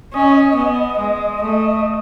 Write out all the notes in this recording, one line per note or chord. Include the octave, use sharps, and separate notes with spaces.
C#4 D#5
B3
G#3
A3